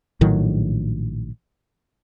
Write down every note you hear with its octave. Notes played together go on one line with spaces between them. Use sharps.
A#1 A2 D#3 F#3